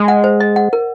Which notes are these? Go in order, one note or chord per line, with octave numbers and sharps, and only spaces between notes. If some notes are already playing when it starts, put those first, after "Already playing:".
Already playing: G#3
F#5
C5
D#5
F#5
A#4